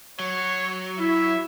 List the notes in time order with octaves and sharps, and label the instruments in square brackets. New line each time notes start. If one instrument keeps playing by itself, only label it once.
[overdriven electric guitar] F#3 [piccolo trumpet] C#5
[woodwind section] E4 [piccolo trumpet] E5